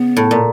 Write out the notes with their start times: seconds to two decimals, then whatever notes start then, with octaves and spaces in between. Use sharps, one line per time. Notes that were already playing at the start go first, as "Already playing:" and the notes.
Already playing: C#3 B3
0.17 A2
0.31 A#2